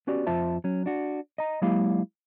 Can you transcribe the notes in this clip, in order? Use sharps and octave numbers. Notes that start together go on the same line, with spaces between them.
B3 C#4 F#4 G4 D5
F2 F4 C5 E5 A5
F#3 C#4
D4 F#4
D#5 A#5
F#3 G#3 A#3 E4 G4 F5